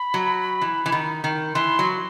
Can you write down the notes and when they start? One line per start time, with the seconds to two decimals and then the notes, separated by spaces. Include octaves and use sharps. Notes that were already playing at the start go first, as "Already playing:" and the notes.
Already playing: B5
0.14 F#3
0.61 E3
0.86 E3
0.92 D#3
1.24 D#3
1.55 E3 C6
1.79 F#3